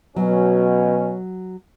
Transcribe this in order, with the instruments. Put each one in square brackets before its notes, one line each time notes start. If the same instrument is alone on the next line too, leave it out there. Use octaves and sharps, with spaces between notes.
[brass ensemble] B2 C#4 [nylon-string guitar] F#3